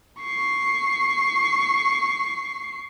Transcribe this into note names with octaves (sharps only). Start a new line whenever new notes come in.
C#6 C7